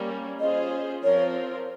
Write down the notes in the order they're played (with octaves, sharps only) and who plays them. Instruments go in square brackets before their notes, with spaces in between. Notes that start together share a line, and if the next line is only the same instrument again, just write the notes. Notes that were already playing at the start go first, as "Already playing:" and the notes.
Already playing: [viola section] G3 A#3 C#4
[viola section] C#4 F4 G#4 C5 [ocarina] D#5
[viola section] F3 C4 F4 A#4 [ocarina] C#5